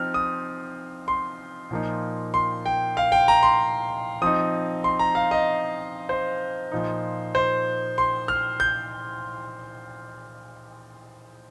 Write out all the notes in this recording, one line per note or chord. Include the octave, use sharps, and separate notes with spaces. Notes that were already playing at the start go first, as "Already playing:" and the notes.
Already playing: F3 C4 D#4 F6
D#6
C6
A#2 F3 A#3 D#4
C6
G5
F5
G5
A#5
C6
F3 C4 D#4 D#6
C6
A#5
F5
D#5
C5
A#2 F3 D#4
C5
C6
F6
G6